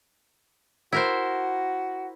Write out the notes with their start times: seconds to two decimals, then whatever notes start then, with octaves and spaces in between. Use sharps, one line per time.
0.92 E4 F#4 A#4 C5